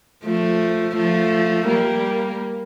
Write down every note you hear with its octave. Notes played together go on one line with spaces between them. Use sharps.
F3 A3
F3 A3
G3 A#3